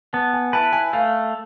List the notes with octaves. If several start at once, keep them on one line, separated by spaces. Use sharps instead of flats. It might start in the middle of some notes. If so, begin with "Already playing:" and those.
B3 A5
G#5
E4 B4 A5
G#5
A3 F5